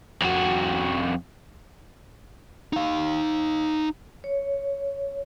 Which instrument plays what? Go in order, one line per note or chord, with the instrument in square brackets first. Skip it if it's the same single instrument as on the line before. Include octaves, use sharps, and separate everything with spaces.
[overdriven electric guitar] F2 F#4
[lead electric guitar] D#4 F5
[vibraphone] C#5